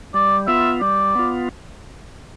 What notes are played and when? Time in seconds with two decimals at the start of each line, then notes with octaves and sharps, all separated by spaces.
0.14 G3 D5
0.48 B3 F4 E5
0.81 G3 D5
1.15 B3 F4